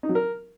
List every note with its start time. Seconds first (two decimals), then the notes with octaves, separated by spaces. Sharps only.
0.03 D#4
0.09 F#3
0.15 A#4